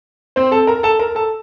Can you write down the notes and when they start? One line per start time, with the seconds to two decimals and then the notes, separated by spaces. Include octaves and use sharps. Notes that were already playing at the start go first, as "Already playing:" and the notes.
0.36 C4 C5
0.52 A4 A5
0.67 A#4 A#5
0.83 A4 A5
0.99 A#4 A#5
1.15 A4 A5